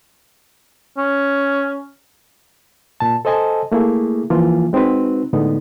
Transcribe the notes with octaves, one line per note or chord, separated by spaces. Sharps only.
C#4
A#2 A5
A4 C5 D#5 G#5 A5
A3 A#3 E4 G#4
E3 F3 A#3 F4
G#3 C4 D#4 F#4 B4
A2 D3 G#3 B3 D#4